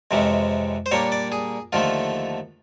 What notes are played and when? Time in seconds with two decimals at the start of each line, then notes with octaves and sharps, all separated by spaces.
0.11 F2 C3 E3 G#3 C#4
0.86 C5
0.91 A#2 G3 A#3 D4 C#5
1.12 D5
1.32 G#4
1.73 D#2 D3 F3 A3 F4